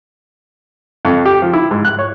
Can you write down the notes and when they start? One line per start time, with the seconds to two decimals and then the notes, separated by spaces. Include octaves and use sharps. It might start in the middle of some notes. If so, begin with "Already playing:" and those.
1.05 F2
1.26 G4
1.42 F3
1.53 E4
1.71 G#2
1.85 F#6
1.99 C#5